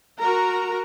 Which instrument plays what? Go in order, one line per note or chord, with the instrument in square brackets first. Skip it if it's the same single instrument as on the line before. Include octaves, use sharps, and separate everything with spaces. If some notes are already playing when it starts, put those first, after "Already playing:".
[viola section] F#4 A#4 A#5